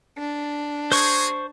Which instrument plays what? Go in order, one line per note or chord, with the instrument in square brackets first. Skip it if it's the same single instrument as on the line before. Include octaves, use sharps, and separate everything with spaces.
[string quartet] D4
[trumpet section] A#3 F#4 G#4 [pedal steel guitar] C5 C#6